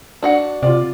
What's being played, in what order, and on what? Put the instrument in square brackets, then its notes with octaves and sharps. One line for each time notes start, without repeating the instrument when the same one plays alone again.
[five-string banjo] D4 F#4 F#5
[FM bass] C3 [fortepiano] F4 D5